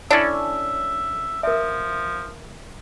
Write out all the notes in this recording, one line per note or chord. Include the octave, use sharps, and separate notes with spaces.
C#4 D4 E4 A4 D5 E5
F3 A#4 E5